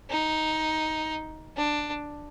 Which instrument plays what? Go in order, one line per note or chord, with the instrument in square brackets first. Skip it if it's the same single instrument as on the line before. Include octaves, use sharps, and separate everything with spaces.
[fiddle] D#4
D4